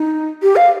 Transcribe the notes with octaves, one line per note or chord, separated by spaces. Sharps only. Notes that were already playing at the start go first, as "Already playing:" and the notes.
Already playing: D#4
G4
F5